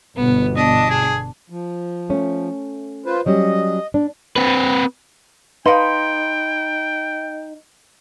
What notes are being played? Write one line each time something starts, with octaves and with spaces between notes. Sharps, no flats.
G1 B2 B3
D4 D#5
G#4
F3
A3 C#4
F4 B4 C5
F#3 G3 C#4 D#5
D4
C4 B4
D#4 B4 F5 G5 B5 C6